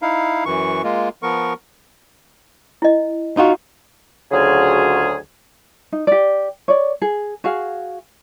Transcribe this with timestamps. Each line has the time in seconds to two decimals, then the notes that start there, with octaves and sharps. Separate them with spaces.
0.02 D#4 E4 F5
0.46 F#2 E3 C#6
0.84 G#3 A#3 F4
1.23 F3 B3 A#4 C#6
2.82 E4 D#5
3.37 D#4 F4 F#4
4.31 D2 C#3 F#3 F4 G#4
5.92 D#4
6.07 G4 D5
6.68 C#5 D5
7.02 G#4
7.44 F#4 G#4 F5